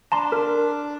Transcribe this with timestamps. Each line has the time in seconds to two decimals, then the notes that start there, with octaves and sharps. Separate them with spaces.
0.12 D4 A5 A#5 C6
0.32 A#4